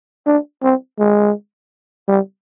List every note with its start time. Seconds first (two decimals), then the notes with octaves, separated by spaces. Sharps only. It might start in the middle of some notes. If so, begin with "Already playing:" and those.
0.27 D4
0.63 C4
0.99 G#3
2.08 G3